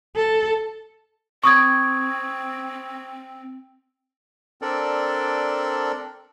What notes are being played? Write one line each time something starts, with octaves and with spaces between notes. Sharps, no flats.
A4
C4 C#6 D#6 G#6
C4 D4 A4 A#4 D5